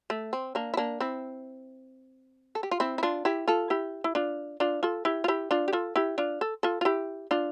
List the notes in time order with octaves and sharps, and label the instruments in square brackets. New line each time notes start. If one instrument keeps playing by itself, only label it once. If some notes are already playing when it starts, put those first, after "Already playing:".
[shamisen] A3
C4
A#3 D4
E4
A#3 D4
C4 E4
A4
G4
F4
C4 E4
E4
D4 F4
E4 G4
F4 A4
E4 G4
E4
D4 F4
D4 F4
F4 A4
E4 G4
F4
E4 G4
D4 F4
G4
F4 A4
E4 G4
D4 F4
A4
F4 A4
F4
E4 G4
D4 F4